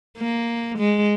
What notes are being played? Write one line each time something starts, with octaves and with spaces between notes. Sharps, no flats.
A#3
G#3